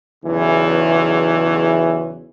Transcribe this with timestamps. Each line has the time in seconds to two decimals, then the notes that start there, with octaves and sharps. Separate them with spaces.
0.24 B1 E2 C#3 E3